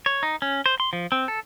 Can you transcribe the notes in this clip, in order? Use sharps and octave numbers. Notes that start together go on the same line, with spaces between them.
C#5
D#4
C#4
C5
C6
F3
C4
A4